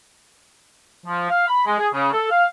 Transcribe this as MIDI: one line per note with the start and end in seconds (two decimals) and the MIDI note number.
1.06 1.28 53
1.30 1.45 77
1.47 1.66 83
1.66 1.75 56
1.79 1.88 68
1.94 2.10 49
2.12 2.30 69
2.31 2.46 77